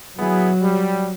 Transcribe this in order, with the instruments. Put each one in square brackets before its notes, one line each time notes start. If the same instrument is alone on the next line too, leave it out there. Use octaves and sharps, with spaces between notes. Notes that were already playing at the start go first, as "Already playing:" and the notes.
[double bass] F#3 [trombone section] B3 E4 G#4
[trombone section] G3